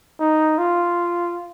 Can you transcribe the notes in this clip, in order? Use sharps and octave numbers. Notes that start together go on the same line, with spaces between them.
D#4
F4